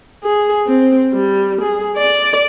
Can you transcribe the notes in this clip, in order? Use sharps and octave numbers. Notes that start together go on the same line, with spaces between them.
G#4
C4
G3
G#4
D5